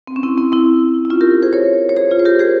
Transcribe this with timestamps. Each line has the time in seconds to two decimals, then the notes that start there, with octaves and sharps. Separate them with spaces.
0.07 C4
0.16 C#4
0.23 C4 E4
0.38 C4 E4
0.52 C4 E4
1.05 E4
1.10 C#4 F4
1.21 G4 A#4
1.42 G#4 C5
1.53 A#4 C#5
1.89 C#5
1.97 G#4 C5
2.11 F4 G#4
2.19 C5
2.25 G4 A#4
2.39 G#4 C5